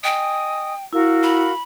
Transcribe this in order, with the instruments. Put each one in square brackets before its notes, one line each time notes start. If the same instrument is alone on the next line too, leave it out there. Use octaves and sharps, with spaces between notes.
[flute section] D#5 G#5 D#6 [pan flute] G5
[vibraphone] E4 [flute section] F#4 A#4 F5
[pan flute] B5